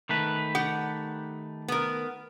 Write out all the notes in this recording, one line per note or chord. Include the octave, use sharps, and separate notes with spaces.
D#3 A3 B4
G4 F#5
B3 A#4